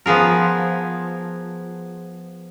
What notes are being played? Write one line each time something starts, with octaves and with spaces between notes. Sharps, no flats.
F3 B3 G#4 A#4